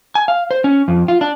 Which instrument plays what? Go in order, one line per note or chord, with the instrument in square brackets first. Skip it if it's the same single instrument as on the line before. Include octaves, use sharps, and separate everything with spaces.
[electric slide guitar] G#5
F5
C5
C#4
F2
F4
D4